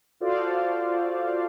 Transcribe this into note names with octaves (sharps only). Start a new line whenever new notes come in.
F4 F#4 A4 C5 D5 F5